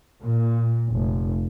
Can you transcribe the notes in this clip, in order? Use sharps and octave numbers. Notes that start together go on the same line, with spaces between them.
A#2
F1